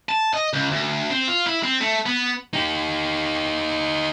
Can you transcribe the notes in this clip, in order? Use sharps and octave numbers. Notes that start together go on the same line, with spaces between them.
A5
D#5
C#2
D2
C4
F4
E4
C4
A3
B3
D#4 G4